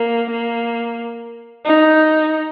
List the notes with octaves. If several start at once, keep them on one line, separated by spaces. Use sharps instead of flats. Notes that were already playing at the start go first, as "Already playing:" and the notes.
Already playing: A#3
A#3
D#4